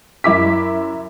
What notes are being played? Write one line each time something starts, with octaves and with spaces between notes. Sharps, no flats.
F#2 E4 D6 B6